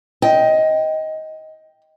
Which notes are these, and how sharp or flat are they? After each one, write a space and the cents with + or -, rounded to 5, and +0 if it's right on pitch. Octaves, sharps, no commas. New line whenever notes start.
D#5 +15 G5 +0